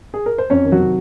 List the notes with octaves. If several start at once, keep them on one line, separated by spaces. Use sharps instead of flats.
G#4
A#4
C5
F2 C#4 C#5
D#3
F#3 F#4
C3